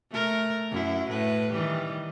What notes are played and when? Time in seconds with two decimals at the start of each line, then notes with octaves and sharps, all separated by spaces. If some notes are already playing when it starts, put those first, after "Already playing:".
0.11 A3 A#4
0.71 F#2 E4
1.09 A2 B4
1.52 D#3 E3 G3